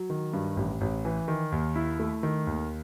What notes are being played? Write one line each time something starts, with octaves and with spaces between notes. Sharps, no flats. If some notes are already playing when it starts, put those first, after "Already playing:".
Already playing: F#3
D#3
G2
A1
A1
E3
D#3
D#2
E4
A3
D#3
D#2